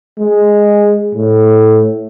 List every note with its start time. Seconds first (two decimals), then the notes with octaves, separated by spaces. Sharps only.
0.19 G#3
1.15 A2